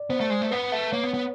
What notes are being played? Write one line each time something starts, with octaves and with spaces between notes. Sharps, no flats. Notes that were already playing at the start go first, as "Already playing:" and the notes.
Already playing: D5
B3 C5
A3
G#3
A3
B3 B4
A3
A#3 C#5
B3
B3